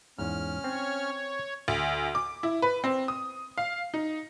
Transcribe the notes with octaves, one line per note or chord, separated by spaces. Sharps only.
E2 G#2 C#4 F6
C4 C#5
D2
D6
E4
B4
C4
D#6
F5
D#4